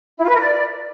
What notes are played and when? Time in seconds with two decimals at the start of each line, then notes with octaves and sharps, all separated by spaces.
0.18 E4
0.23 F4
0.29 B4
0.34 A#4
0.39 D5